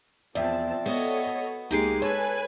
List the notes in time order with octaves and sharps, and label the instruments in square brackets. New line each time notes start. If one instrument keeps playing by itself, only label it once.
[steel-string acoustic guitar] E2 [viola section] F3 C4 A5 [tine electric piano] D5 E5 G5
[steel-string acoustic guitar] B3 F#4 [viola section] A4 C#5 D#5
[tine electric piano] C#2 C7 [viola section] G#3 A#3 [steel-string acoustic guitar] D#4 G4 G#5
[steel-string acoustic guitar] A4 [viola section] B4 G#5 [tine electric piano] C#5